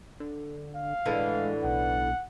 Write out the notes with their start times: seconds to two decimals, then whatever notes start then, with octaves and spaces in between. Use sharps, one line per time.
0.20 D3
0.76 F5
1.06 A2 D3 E3 G#3
1.64 B1 F#5